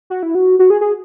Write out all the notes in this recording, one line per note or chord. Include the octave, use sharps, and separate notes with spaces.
F#4
E4
F#4
F#4
G#4
G#4